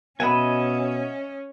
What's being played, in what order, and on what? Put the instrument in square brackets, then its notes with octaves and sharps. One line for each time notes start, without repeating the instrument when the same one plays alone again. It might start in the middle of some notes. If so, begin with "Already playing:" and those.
[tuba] B2 [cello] C#4 [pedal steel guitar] D#5 E5 G#5 [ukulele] F#5 B5